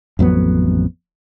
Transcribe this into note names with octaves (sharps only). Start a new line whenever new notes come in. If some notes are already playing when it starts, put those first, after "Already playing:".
A1 F2 F#3 B3